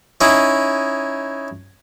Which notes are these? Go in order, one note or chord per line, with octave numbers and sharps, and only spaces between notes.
C#4 D#4 E4